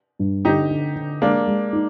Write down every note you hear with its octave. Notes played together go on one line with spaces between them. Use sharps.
G2
D3 D#4 G4
D3
D3
G#3 A#3 D4
G#3
D#4